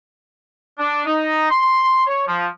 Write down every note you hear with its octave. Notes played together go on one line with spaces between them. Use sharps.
D4
D#4
C6
C#5
F3